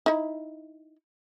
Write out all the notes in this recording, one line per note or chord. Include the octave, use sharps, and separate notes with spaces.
D#4 E4